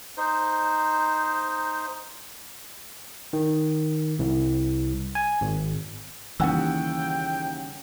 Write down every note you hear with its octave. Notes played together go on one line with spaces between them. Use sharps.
D#4 C5
D#3
C2
G#5
G#1
D#2 C#3 E3 G3 F#5 G5 E6